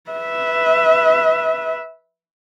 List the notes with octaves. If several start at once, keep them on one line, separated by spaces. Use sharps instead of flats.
B4 E5